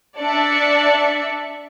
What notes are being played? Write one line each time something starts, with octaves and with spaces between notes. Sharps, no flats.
D4 D5 E5 A5 C#7